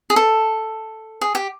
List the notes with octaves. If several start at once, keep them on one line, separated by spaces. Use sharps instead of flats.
G#4
A4
G#4
G4